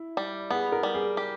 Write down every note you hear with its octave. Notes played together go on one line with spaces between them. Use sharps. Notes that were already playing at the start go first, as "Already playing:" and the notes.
Already playing: E4
G3
B3 G#4
A#4
G3
G#4
G4